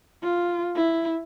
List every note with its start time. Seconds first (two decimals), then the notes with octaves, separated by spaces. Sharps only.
0.23 F4
0.76 E4